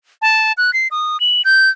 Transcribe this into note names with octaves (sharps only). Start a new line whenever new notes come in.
A5
F#6
C7
D#6
F#7
G6